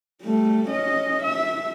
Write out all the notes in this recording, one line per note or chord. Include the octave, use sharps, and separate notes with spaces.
G3 A3
C#4 D#5
E5